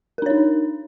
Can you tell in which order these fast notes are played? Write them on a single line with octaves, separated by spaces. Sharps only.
A#4 D4 C#5 D#4